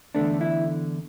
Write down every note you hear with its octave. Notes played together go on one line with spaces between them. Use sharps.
E2 D3 A3 D4
E4